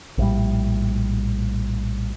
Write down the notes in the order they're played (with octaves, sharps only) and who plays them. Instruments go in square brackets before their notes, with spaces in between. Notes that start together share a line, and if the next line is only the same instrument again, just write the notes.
[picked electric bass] A#1 A2 G3